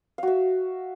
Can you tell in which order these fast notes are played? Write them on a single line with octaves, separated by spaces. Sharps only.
F5 F#4 E5